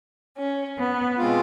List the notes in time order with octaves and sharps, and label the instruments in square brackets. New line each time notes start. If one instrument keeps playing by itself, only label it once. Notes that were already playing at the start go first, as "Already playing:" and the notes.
[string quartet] C#4
B3
[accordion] B2 G#3 C4 F4